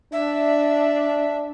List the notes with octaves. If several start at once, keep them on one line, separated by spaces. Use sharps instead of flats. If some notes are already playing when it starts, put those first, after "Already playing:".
D4 E5